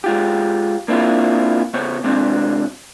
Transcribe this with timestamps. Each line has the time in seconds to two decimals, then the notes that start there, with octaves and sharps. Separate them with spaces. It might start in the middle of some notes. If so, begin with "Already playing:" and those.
0.04 G#3 F4 G4
0.88 A#3 C4 D4 E4 F4
1.74 C#3 B3 C5 C#5
2.04 C3 G#3 C4 D4